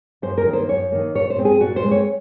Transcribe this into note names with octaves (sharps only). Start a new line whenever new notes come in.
F#2 C5
A#4
D#3 A#3
C5
F#2 C#5
D#3 A#3
A#2 C#5
C5
G#3 C4
G#4
A#2 F#4
C5
G#3 C4
C#5